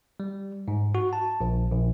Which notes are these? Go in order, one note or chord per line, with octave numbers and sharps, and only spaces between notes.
G3
G#2
F#4
A5
A#1
A#1